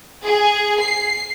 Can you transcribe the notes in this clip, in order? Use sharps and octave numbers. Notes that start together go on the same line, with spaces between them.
G#4
C7